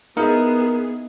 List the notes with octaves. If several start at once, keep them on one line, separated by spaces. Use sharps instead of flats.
B3 D#4 E4 G#4 A#4